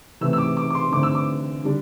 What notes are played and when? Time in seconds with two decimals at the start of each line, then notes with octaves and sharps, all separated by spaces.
0.21 C3 E3 A3 E6
0.33 E6
0.38 D6
0.57 D6
0.70 D6
0.75 C6
0.92 D3 A3 C4 D6
1.03 E6
1.15 D6
1.63 D3 G3 D4